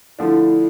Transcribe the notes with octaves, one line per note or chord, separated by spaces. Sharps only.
D3 F3 A3 D4 E4